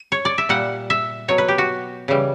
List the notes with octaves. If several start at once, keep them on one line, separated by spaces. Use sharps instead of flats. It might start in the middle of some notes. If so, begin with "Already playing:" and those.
Already playing: B4
C#5
D5
E5
A#2 G3 F#5
E5
B2 F#3 C#5
B4
G4
F#4
C#3 E3 G3